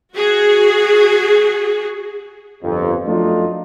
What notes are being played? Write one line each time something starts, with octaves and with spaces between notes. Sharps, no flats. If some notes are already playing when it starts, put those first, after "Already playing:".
F#4 G#4
G1 F2
F#2 F3 A3 D4 D#4 F4